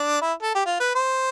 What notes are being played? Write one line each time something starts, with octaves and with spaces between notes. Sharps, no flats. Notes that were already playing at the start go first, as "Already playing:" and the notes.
Already playing: D4
E4
A4
G4
F4
B4
C5